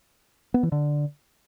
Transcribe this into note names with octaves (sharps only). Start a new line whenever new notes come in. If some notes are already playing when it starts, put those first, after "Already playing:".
B3
E3
D3